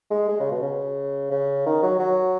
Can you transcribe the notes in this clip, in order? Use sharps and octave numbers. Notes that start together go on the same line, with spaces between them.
G#3
G#3
C#3
B2
C#3
C#3
D#3
F#3
F#3